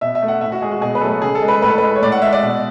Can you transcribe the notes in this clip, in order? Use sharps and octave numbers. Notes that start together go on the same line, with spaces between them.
B2 E5
E5
A3
F#5
A2 E5
F#4
G#3 G#4
F#4
B2 G#4
B4
F#3 A3 A4
C#3 G#4
A4
G#3
B4
A2 B4
A4
G#3 B4
C#5
A2 D5
F#5
G#3 E5
D5
B2